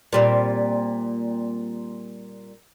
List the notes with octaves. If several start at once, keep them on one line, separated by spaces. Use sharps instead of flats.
A#2 G3 C4